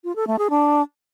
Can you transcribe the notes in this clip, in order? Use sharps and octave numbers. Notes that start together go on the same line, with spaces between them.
F4
A4
A3
G#4
D4